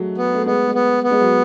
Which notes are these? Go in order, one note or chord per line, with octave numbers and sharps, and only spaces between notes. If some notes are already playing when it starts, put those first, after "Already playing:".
Already playing: F#3 G#3 A3
B3
A3
G#3 B3
G#3
B3
B3
G#3
F#3